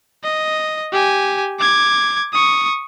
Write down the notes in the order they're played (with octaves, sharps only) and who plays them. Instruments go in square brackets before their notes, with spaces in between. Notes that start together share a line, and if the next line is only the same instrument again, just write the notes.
[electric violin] D#5
G4 G#5
D6 G#6
C#6 D#6